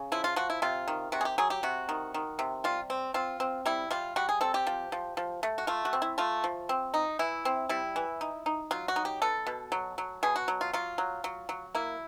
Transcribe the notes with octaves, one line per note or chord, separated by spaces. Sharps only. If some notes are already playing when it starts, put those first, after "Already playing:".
Already playing: C#3
F3 E4
F4
F3 F#4
E4
C3 F4
D#3
C3 F#4
G#4
G4
F#3 G#4
G4
C3 F#4
D#3
D#3
C3
G3 F4
C4
C4 F4
C4
G3 E4
G3 F4
G3 F#4
G#4
C4 A4
G4
F3
F3
F3
A3
F#4
A3 F4
F#4
C4
E4
A3 F4
F3
C4
D#4
E3 E4
C4
G3 E4
E3
D#4
D#4
F#3 F4
F#4
D#4
G4
B3 A4
B2
F#3
F#3
B2 G#4
F#4
F#3
F4
F#3 F4
F#3
F#3
F#3
A#3 E4